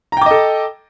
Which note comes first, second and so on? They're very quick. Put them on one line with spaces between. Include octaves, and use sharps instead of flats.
A#5 G5 D6 D#5 A4